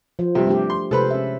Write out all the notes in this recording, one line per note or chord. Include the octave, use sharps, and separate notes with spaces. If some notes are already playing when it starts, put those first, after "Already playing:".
F3 C5
G2 C3
A3 D4 G4
C6
C3 G#3 A4 B4 C5 B5
C#4 E5